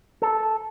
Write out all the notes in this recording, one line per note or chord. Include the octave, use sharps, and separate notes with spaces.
A4